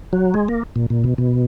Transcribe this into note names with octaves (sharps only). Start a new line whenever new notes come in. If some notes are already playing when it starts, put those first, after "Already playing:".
F#3
G#3
A#3
A#2
A#2
B2
B2